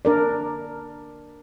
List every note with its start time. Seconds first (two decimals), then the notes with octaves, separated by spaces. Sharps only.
0.05 D4 A#4 D5